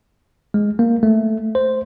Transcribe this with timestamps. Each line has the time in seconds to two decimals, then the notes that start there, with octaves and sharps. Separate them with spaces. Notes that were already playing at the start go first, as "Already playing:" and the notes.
0.54 G#3
0.79 A#3
1.03 A3
1.55 C5